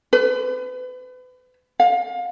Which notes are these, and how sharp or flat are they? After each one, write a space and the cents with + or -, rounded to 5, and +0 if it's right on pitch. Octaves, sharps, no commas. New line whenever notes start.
B4 +35
F5 +30